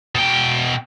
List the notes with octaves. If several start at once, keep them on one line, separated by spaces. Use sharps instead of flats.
B2 G5